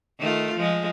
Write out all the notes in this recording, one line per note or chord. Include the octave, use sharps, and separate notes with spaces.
D#3 A3 F4
F3 G#3